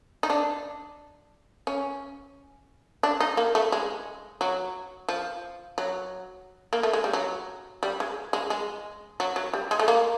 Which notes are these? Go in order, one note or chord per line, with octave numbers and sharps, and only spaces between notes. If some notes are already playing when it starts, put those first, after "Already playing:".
D#4
D4
C#4
D4
D#4
A#3
A3
G#3
F#3
F3
F#3
A#3
A3
G#3
G3
F#3
G3
G#3
G#3
G#3
F#3
F#3
G3
G#3
A3
A#3